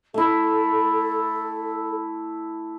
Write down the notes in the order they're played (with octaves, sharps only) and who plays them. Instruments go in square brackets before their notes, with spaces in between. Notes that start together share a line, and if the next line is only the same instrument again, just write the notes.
[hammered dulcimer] A3 E4 [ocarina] A4